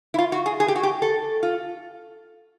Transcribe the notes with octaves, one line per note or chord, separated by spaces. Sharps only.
E4
F4
F#4
G#4
G#4
G4
F#4
G4
A4
F4